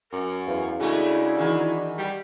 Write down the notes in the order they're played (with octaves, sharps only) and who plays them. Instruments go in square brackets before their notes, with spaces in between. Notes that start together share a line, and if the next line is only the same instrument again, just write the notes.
[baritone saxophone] F#2 [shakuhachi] A#4
[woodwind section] E2 [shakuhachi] F5
[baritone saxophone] C#3 [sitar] G#3 A3 [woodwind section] D4 F#4 [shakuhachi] E4
[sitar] D#3 E3
[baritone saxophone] G3